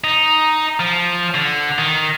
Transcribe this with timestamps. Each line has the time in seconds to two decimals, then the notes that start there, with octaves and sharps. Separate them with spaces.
0.04 D#4
0.80 F3
1.35 D3
1.79 D#3